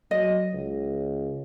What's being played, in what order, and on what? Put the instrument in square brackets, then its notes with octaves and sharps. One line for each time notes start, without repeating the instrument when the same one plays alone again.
[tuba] F#3 [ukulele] D#5
[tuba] C#2